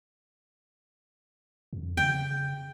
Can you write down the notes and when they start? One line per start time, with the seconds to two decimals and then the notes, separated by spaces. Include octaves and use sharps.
1.73 F2
1.97 C#3 G5